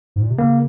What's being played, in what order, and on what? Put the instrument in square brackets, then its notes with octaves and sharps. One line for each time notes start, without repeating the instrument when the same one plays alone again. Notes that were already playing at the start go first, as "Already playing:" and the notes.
[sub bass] G#2
A#2
C3
[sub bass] C#3 [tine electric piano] A#3